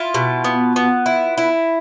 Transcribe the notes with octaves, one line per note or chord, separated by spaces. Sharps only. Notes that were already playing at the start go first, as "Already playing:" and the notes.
Already playing: E4 F4
B2
B3
B3
E4
E4